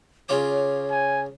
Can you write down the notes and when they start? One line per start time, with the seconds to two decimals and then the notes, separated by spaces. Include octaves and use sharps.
0.29 C#3 F4 C#5 D6
0.90 G#5